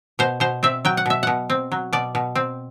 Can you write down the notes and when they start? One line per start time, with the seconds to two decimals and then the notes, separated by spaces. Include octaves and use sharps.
0.19 B2 C5
0.40 B2 C5
0.63 C4 E5
0.85 F#3 G5
0.97 F#5
1.06 B2 E5
1.23 B2 F#5
1.50 C4
1.72 F#3
1.93 B2 D5
2.15 B2
2.35 C4